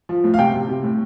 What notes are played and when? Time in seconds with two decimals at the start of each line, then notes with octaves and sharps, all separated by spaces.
0.09 F3
0.24 A2
0.34 F5
0.39 C3 G5
0.54 C3
0.69 C3
0.84 A2